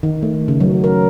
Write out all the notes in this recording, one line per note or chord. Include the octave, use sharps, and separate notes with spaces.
D#3
A3
C#3
F#3
A#4